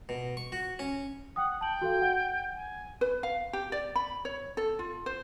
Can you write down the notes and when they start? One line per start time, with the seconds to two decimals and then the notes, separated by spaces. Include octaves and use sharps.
0.09 B2
0.37 C#6
0.52 F#4
0.79 C#4
1.36 F#5 G5 D#6
1.61 G5 A5 F#7
1.81 F#4 A4 F5
2.01 F#5
2.56 G#5
3.01 B4
3.23 F5
3.53 G4
3.72 D5
3.96 B5
4.25 C#5
4.57 A4
4.79 F4
5.06 C5